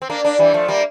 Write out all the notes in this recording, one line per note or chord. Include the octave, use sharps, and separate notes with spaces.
C4
A#3 D4
A#3 D4
E3 G3
F3 A3
G3 A#3